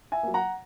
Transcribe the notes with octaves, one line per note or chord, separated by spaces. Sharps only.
E5 G#5
F#3 A#3
F#5 A#5